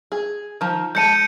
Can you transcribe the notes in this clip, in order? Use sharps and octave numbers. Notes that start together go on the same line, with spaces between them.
G#4
D#3 F3
G#3 A5 G6 C#7 D#7